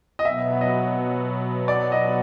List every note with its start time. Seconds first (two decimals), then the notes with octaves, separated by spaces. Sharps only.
0.19 D#5
0.25 B2 F#3 B3 E5
0.61 D#5
1.68 D5
1.92 D#5